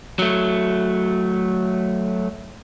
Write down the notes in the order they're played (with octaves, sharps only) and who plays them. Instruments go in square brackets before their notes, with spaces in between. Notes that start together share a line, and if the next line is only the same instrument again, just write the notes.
[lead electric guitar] F#3 A3